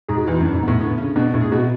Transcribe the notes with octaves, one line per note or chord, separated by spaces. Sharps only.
G#2 G#4
F#4
E2 E4
F#2 D4
G#2
A2 B3
D3 B3
C#3 C#4
B2 D4
A2
G#4
B2 F#4